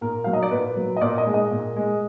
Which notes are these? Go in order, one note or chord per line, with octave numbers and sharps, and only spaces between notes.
A#2 A#4
F#3 F5
D#5
D5
A#2 B4
F#3
D#5
A#2 D5
D#5
G#3
D#5
A#2
G#3